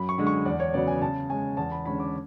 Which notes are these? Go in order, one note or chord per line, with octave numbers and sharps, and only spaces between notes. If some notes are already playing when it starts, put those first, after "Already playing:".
Already playing: F#2 B5
C#6
D3 G#3
C#6
E2 D5
C#5
C#3 F#3 B3 D5
G#5
C#3 A5
G#3 C#4 G#5
E2 A5
B5
D3 G#3 C#4 B5
D6